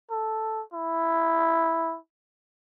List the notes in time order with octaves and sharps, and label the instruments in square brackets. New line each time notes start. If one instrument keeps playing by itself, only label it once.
[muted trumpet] A4
E4